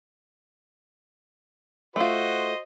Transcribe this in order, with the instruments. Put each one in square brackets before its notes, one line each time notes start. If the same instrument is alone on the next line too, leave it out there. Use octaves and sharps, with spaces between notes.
[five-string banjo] A3 F4 [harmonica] F#4 C5 D#5